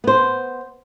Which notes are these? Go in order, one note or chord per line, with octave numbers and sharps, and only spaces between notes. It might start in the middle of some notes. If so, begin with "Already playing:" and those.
B3 C5